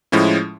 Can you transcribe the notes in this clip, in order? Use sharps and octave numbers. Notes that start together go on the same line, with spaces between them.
A2 F3 G#3 C#4 E4